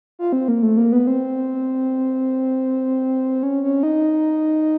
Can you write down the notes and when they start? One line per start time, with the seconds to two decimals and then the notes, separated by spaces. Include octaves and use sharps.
0.19 F4
0.33 C4
0.48 A#3
0.63 A3
0.77 A#3
0.93 B3
1.07 C4
3.43 C#4
3.63 C#4
3.83 D#4